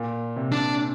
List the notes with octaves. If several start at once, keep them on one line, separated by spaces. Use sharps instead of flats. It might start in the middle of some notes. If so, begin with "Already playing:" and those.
Already playing: A#2
C3
D4